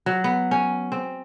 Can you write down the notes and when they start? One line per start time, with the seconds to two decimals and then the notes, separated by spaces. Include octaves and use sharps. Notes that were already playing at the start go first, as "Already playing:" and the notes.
0.06 F#3
0.24 B3
0.51 C#4
0.92 C4